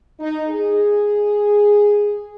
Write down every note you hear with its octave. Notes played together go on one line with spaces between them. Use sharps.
D#4
G#4